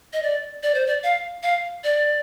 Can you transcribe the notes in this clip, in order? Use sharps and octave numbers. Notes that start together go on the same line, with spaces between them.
D#5
D5
D5
C5
D5
F5
F5
D5